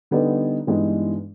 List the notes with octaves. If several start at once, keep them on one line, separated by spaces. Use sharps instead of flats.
D3 G3 B3 D#4
G2 E3 G#3 B3 D#4